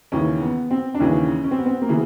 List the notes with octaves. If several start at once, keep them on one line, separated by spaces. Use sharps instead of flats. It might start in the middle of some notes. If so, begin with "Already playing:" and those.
D#2 C#3 E3 C#4
B3
C4
D4
D#2 C#3 E3 C#4
C#4
C4
B3
C4
A#3
C#3 E3 B3